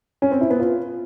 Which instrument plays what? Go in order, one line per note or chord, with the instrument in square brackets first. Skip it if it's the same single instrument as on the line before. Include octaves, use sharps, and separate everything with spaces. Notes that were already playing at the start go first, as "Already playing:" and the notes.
[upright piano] C#4
C4
E4
B3
F4